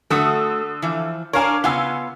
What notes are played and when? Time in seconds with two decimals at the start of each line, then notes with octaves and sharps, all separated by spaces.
0.10 D3 A3 F#4 A4 D#6
0.82 E3 F3
1.33 D4 A#4 C#5 F5 G#5
1.64 C#3 B3 F4 F#5 G#5 E6